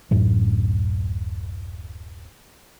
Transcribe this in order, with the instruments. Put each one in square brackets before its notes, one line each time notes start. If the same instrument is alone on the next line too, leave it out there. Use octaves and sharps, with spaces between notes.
[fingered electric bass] D1 F#2 A2 F#3